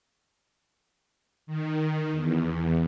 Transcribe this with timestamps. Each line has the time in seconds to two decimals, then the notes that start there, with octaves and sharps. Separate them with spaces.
1.47 D#3
2.13 E2